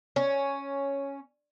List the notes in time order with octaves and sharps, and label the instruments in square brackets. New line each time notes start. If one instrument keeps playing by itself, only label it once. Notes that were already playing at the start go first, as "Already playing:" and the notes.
[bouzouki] C#4